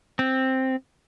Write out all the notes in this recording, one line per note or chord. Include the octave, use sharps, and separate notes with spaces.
C4